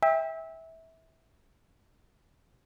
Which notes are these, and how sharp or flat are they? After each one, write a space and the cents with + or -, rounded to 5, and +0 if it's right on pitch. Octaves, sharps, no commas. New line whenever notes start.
E5 -20 G5 +30